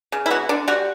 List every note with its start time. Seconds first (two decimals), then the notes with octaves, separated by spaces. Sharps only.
0.12 C#3
0.26 E4
0.30 B3 F#4
0.49 D3 D4
0.68 G3 F#4